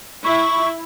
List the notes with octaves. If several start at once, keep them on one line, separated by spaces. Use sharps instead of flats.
E4 C#6